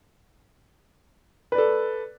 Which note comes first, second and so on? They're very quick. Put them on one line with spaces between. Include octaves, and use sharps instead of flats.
B4 D5 A4